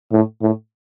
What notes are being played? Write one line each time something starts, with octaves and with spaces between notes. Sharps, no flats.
A2
A2